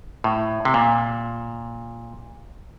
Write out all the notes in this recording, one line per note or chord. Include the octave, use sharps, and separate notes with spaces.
A2
C3
A#2